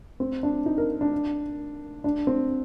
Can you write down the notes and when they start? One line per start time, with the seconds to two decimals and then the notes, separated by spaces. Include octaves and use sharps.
0.20 C4
0.43 D4
0.66 D#4
0.78 A#4
1.01 D4
2.04 D4
2.27 C4